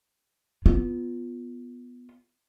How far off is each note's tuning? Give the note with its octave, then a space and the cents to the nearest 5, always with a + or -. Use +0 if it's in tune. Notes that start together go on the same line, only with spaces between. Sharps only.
B3 +0 F4 +0